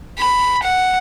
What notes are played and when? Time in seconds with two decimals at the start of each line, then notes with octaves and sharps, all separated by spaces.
0.18 B5
0.63 F#5